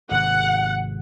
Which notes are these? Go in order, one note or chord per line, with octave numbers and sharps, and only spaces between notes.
G#1 C3 F#5